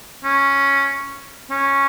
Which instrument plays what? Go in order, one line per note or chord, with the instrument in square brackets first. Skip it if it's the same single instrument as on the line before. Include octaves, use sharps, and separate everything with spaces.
[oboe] C#4
C#4